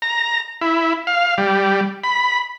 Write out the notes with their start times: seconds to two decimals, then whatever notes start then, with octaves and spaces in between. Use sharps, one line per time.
0.02 A#5
0.61 E4
1.07 F5
1.38 G3
2.04 B5